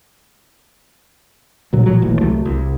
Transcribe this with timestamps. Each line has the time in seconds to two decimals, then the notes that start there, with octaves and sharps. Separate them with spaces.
1.73 D2 A#2 F#3
1.86 A#2 F3 F#3
2.02 D#1 A1 D#2 A2
2.20 C2 F#3 A3
2.45 C2